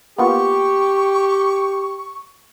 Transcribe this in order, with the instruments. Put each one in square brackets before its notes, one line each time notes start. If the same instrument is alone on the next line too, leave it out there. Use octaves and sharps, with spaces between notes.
[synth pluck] A#3 B3 F4 [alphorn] G4 [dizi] C#6